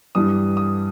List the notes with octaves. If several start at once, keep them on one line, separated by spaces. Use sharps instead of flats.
G2 E3 G3 D#6
D#6